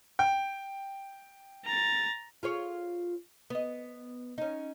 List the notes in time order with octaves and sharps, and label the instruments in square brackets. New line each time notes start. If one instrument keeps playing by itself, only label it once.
[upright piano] G5
[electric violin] A#5 A6
[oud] F4 G#4 C#5
B3 D#5
C#4 D#4